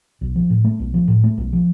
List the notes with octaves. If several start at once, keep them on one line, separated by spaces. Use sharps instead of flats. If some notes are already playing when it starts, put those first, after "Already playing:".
B1
F3
A2
A3
B1
F3
A2
A3
B1
F3